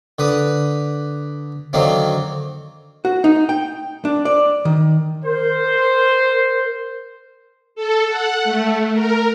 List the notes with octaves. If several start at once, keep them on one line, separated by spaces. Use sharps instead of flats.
D3 B4 D#6
D3 D#3 F#3 A#3 C4
F#4
D#4
G5
D4
D5
D#3
A#4 C5
A4
F#5
A3
A#4